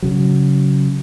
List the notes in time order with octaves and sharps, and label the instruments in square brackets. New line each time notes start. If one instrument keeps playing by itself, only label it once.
[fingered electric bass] C#3 F#3